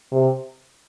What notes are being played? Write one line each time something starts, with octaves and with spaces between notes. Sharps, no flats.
C3